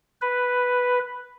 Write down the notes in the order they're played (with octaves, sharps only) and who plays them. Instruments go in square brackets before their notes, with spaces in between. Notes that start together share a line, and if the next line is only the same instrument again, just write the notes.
[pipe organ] B4